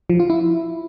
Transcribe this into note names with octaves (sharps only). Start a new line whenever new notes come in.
F3
F4
E4